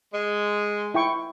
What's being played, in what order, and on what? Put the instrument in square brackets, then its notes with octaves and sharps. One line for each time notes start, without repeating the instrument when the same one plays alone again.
[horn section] G#3
[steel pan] E4 G5 C#6